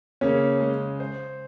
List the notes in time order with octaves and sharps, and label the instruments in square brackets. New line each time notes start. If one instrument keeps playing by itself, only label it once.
[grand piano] C#3 [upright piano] A#3 C#4
[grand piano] G#3
C5